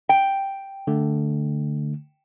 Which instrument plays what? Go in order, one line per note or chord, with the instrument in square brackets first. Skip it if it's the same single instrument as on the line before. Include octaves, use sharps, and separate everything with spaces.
[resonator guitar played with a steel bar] G5
[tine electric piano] D3 A3